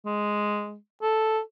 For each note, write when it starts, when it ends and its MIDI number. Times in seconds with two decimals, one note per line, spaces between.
0.05 0.76 56
1.02 1.40 69